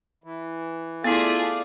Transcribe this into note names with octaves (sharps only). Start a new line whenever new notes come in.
E3
A3 B3 E4 F4 G#4 A4 D5 F5